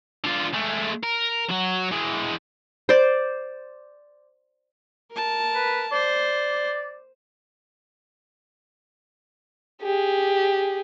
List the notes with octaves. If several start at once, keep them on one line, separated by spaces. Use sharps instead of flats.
D3 F4
G#3 A3
A#4
F#3 F#4
E3 G#3
C5 D5
A#4 A5
B4
C5 D5
G4 G#4